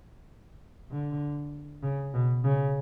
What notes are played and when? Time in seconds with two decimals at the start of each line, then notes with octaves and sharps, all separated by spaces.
0.91 D3
1.83 C#3
2.14 B2
2.44 C#3